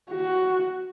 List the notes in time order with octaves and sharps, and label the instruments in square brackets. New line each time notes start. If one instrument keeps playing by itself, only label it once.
[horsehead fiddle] F#4